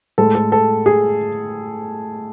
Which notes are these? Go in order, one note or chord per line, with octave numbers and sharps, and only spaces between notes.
A2 G#3 A4
A4
A4
G#4